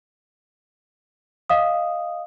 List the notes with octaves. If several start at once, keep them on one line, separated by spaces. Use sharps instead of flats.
D#5 F5 D#6